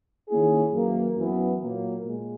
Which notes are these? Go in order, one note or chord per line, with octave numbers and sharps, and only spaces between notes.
D#3 A#3 C#4 E4 G#4
F#2 E3 A#3
F#2 E3 B3
A#2 F#3 A#3
A#2 G#3